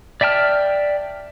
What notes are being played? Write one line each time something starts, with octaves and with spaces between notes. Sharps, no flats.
D5 E5 G5 A5 F6